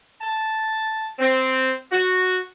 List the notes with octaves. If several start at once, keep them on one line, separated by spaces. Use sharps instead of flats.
A5
C4
F#4